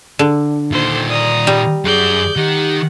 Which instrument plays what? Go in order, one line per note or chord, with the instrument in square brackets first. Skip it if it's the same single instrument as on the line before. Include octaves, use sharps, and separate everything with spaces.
[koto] D3 [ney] D4
[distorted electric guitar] A#2 D#3 [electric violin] A4 C5
[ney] D5 [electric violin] A#5 D#6
[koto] G3
[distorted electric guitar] F#2 F#4 [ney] G#4 [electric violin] D5 G6
[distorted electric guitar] D#3 [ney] G4 [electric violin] F#5